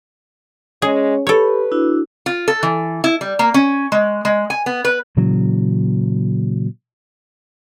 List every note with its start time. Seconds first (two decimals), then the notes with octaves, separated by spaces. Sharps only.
0.82 G#3 C#4 G#4 C#5
1.27 G4 A4 B4 C#5 B5
1.72 D4 E4 F#4
2.26 F4
2.48 A4
2.63 E3
3.04 E4
3.21 G3
3.39 A#3
3.54 C#4
3.92 G#3
4.25 G#3
4.50 G#5
4.66 B3
4.85 B4
5.17 A#2 C#3 E3 F#3